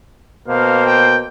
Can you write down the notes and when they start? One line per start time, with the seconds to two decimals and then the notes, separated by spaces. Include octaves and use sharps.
0.48 B2 A#3 C5 F5
0.86 G5